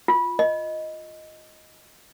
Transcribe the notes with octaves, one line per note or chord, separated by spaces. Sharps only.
F4
D#5